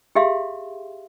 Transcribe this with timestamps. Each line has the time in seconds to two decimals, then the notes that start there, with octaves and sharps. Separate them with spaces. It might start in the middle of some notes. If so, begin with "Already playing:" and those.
0.15 G4 G#4 E5 F5 C6